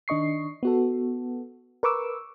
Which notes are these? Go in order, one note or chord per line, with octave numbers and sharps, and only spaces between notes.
D#3 D4 D#5 C#6 C7
B3 F#4 A4
A#4 B4 C#6 D6 E6